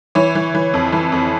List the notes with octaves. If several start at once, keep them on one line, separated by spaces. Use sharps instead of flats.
E3 C#5
E3
E3
F2
E3
F2